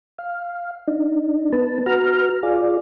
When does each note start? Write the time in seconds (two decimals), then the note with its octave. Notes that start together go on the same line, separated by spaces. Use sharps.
0.18 F5
0.88 D4 D#4
1.53 B3 B4 A5
1.86 F#4 B4 A#5 F6
2.43 F4 G#4 D5